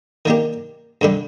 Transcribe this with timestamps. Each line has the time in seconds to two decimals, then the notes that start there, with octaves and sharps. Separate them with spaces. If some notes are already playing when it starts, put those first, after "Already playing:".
0.25 D#3 A#3 D4 G4
1.01 G2 D3 G3 D4